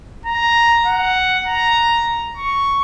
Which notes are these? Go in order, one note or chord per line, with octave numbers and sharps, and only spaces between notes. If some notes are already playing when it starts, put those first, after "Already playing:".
A#5
F#5
A#5
C#6